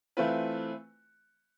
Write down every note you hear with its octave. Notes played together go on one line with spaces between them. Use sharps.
E3 A3 C4 F4 B4